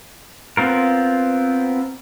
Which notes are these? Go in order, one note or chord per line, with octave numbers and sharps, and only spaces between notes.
B3 C4 F4 A#4